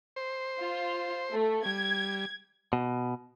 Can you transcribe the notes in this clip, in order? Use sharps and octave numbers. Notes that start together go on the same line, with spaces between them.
C5
F4
A3
G3 G#6
B2